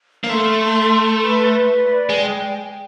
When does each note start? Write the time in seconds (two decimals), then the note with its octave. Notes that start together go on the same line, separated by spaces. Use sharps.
0.24 A#3
0.29 A3 C6
0.60 C6
0.90 C6
1.20 B4
1.50 B4
1.80 D5
2.09 G#3 G5